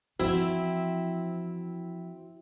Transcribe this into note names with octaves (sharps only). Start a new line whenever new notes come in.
E3 F3 C4 E4 F#4